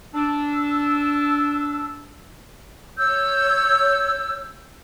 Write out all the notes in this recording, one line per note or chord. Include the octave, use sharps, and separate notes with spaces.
D4 E6
C#5 E6 G6